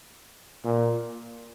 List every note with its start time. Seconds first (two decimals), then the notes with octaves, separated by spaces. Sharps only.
0.64 A#2